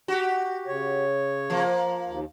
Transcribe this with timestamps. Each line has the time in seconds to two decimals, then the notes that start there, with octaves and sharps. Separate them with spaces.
0.08 F#4 G4
0.67 C#3 C#5
1.50 F3 A#3
2.06 D#2